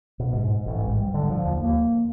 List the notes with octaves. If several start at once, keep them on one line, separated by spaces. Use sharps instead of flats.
B2
G#2
A1
G#2
G3
D3
F3
D#2
A#3